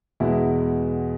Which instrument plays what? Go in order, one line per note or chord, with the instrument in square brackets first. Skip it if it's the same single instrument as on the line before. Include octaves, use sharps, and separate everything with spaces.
[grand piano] E2 B2 G#3 E4